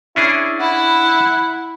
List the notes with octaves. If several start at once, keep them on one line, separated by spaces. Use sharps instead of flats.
C#4 D4 E4 G#4
E4 F#5 B5